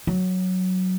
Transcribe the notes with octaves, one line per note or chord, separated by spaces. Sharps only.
F#3